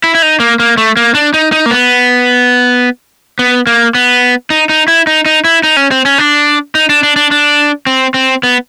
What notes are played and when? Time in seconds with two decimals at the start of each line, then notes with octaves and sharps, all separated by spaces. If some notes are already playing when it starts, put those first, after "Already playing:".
0.04 E4
0.15 E4
0.22 D#4
0.40 A#3
0.59 A#3
0.77 A3
0.97 A#3
1.15 D4
1.34 D#4
1.52 D#4
1.66 A#3
1.71 B3
3.39 B3
3.67 A#3
3.95 B3
4.50 D#4
4.69 D#4
4.88 E4
5.07 D#4
5.26 D#4
5.44 E4
5.63 D#4
5.77 C#4
5.91 C4
6.05 C#4
6.18 D4
6.75 D#4
6.89 D4
7.03 D4
7.16 D4
7.31 D4
7.87 C4
8.14 C4
8.43 B3